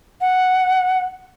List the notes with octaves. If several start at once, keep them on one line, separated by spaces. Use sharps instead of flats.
F#5